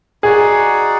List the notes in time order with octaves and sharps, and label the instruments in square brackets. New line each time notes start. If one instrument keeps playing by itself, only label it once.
[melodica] D#4 F#4 D5 F#5 [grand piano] G#4